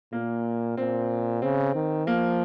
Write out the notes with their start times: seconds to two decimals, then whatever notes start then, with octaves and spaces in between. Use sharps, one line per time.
0.12 A#2 A#3
0.77 A#2 C4
1.42 C#3 C4
1.75 D#3
2.07 F3 A#3